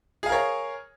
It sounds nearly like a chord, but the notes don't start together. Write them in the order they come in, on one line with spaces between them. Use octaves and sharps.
G#4 F5 A#4 C#5